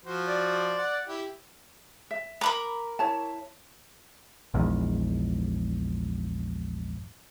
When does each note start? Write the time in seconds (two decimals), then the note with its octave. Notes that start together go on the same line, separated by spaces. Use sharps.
0.05 F3 F#4 C5
0.28 D5
0.78 F#5
1.08 E4 G4
2.11 E5
2.41 A#4 A#5 B5 D6
2.99 E4 C#5 A5
4.54 A#1 E2 G#2